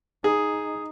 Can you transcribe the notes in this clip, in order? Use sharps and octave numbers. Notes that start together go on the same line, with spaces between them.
D#4 G#4